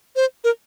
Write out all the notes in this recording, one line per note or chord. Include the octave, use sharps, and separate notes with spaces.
C5
A#4